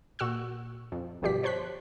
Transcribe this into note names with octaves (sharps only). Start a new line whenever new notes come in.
A#2 F#4 C#6 E6 F#6
F2
G1 B2 F3 G4 D5 B6
C5 C#5 A5 C6 F#6 B6